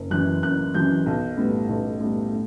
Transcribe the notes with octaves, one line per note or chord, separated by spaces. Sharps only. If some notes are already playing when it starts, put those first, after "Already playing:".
Already playing: F#1
F#2 E3 F#6
F#1 F#6
F#2 E3 G6
B1
A2 G3 B3
B1
A2 G3 B3
A2